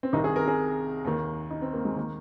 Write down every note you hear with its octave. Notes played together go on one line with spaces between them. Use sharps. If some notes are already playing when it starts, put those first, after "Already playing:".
C4
C2 C3 D#3 D#4
G#4
A#4
G#4
D#2 D#3
D#4
C4
A#3
G#3
D#3 A#3